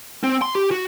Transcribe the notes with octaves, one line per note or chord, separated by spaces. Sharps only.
C4
C6
G4
F#4